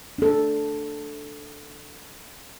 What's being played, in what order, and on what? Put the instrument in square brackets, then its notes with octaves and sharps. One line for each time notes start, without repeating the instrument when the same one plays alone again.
[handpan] D4 A4